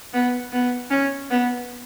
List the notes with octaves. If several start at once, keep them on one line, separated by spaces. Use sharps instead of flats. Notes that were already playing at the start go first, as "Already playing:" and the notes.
B3
B3
C#4
B3